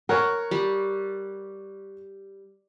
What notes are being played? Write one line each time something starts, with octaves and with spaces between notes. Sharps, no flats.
A#4 C#5 F#5
G3